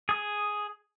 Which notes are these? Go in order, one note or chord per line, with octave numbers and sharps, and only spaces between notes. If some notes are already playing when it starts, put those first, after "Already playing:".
G#4 D#6